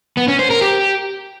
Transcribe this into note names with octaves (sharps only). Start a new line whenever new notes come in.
B3
C#4
C5
A#4
G4